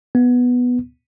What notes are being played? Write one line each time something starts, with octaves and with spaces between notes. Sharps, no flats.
B3